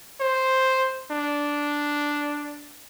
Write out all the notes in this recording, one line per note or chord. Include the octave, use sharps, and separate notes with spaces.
C5
D4